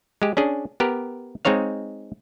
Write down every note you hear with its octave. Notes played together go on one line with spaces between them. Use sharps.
G#3 G4
C#4 D4 G#4
B3 G4 A#4
G#3 C4 D#4 C#5 F5